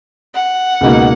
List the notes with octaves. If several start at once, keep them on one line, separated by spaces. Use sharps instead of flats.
F#5
C#2 B2 A#3 D#4